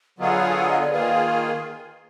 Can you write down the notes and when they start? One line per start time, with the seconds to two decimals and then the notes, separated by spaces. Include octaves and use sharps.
0.18 D3 F#3 B3 F4 G#4 D#5
0.32 F5
0.43 F5
0.55 F#5
0.68 D#5
0.80 D5
0.92 D#3 A#3 F4 G#4 B4
1.30 A#4